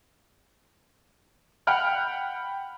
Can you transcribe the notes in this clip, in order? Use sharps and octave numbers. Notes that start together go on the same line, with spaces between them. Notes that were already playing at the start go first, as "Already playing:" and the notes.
F#5 G5 B5 F6 F#6